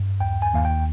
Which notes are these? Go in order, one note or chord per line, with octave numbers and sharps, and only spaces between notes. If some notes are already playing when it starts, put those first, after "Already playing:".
Already playing: G2
D#2 G5
G#5
D#2 F5
G5